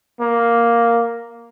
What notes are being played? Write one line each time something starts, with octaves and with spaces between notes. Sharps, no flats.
A#3